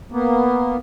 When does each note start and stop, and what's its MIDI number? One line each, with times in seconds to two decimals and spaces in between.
0.12 0.77 58
0.12 0.77 59